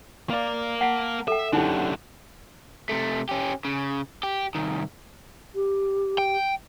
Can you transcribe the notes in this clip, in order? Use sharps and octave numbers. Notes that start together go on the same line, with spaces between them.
A#3 A#4 D5 F5
F#5 A5 B6 D7
A4 E5 G5
F#2 D3 D#4 E4 G4 F#5 A5
C3 A3
C#4 G4
C#3
G4
C2 D#3
G4
G5